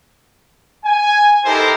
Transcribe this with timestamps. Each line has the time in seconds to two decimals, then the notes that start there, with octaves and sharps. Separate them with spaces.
0.85 G#5
1.45 D#4 E4 G4 A4 A#4 C5